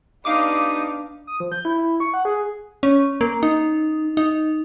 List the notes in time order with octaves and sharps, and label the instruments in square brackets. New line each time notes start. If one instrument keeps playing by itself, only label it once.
[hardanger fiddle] B3 D4 [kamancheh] D#4 [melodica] G4 D#6 [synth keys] F5 D6
[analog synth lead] D#6
F3
G6
E4
E4
C#6
F#5
G#4
[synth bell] C#4
A#3
D#4
D#4